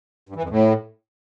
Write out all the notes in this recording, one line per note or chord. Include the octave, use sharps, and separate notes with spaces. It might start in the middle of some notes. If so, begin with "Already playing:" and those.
G2
E3
F2
A2